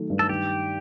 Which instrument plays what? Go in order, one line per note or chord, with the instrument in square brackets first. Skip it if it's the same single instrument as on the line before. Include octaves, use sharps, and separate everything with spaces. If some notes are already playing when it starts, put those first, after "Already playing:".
Already playing: [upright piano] D#3 F#3 A3
G2
[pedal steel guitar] A4
[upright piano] D#3 [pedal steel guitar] G4